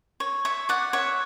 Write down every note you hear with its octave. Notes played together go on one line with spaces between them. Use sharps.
C#5
C#5 E5
D5 F#5
C#5 E5